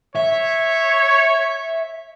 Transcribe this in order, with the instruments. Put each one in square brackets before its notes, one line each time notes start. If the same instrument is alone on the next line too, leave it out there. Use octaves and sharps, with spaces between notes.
[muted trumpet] C#5 [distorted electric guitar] E5